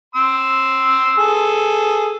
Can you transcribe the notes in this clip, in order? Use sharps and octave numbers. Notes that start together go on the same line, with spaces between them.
C6 E6
G#4 A4